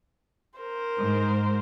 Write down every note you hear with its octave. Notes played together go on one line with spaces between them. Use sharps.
A#4 C5
G#2